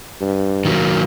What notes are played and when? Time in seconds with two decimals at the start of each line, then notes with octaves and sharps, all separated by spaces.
0.21 G2
0.65 D#3 F#3 A#3